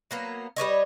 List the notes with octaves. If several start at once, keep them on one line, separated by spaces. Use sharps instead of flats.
F#3 A#3 B3
G3 B4 C#5 D#5